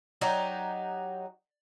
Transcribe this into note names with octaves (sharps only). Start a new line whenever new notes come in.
F#3 D#4 F#4 G4